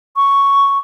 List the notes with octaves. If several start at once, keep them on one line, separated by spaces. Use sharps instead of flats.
C#6